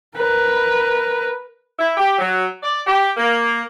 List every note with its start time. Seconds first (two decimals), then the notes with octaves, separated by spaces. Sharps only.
0.17 A#4 B4
1.79 E4
1.97 G4
2.18 F#3
2.63 D5
2.87 G4
3.16 A#3